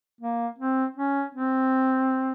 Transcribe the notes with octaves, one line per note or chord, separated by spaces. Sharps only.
A#3
C4
C#4
C4